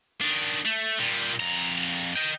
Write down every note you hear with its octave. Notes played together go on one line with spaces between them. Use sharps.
D#3 D4
A3
A#2 G3
F2 A#5
D#5 G5